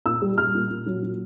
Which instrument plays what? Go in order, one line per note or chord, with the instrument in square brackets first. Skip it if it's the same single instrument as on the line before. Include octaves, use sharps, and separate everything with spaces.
[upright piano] A#2 E6
G3
G3 F6
A#2
A#2
F#3
F#3